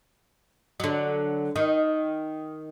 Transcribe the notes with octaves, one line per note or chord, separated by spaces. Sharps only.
D3 F#3
D#3